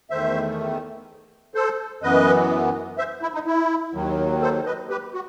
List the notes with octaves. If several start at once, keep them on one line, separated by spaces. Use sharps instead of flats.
E2 D#3 A3 C5 E5
A4 C5
F#2 E3 B3 B4 D#5
C5 E5
E4
D#4
E4
D#2 D#3 F#3
A4 C5
B4 D#5
G4 B4
F#4